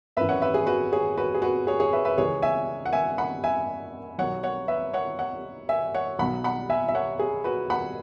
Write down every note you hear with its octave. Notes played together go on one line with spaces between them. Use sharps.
G#1 F#2 E3 B4 E5
C#5 F#5
B4 E5
G#4
F#4 B4
G#4 C#5
F#4 B4
G#4
F#4 B4
G#4 C#5
G#4 C#5
B4 E5
B4 E5
C#2 C#3 E3 G#4 C#5
E5 G#5
F#5
E5 G#5
F#5 B5
E5 G#5
B1 B2 F#3 C#5 F#5
C#5 F#5
B4 E5
C#5 F#5
C#5 F#5
E5 G#5
C#5 F#5
B1 B2 F#3 F#5 B5
F#5 B5
E5 G#5
E5
C#5 F#5
G#4
F#4 B4
F#5 B5